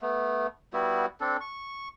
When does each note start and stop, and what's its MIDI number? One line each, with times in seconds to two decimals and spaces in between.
0.01 0.47 57
0.01 0.47 59
0.73 1.06 55
0.73 1.06 59
0.73 1.06 64
0.73 1.06 66
1.20 1.37 60
1.20 1.37 62
1.20 1.37 69
1.41 1.88 85